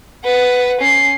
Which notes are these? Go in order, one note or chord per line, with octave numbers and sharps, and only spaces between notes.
B4 F#5
C#4 C7